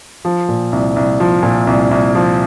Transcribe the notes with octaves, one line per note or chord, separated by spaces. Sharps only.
F3
A#2
C2
C2
F3
A#2
C2
C2
F3